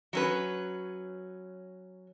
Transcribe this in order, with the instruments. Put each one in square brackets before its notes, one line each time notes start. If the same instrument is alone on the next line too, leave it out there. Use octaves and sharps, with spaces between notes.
[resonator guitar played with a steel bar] F#3 C#4 B4